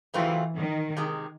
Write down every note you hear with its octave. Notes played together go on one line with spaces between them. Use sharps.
C#3 E3 F#3 A3 C4 F4
D#3
C3 D#3 G#3